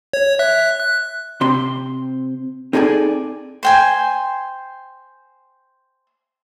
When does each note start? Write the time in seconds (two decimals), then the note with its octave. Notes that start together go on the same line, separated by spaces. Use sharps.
0.13 C#5
0.39 E5 F#6
0.80 F#6
1.41 C3 C4 C6
2.73 C4 D#4 G#4 A4 D5 G#5
3.63 C5 G5 G#5